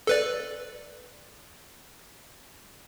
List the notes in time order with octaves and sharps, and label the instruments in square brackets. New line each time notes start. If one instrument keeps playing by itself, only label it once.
[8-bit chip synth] A4 B4 D5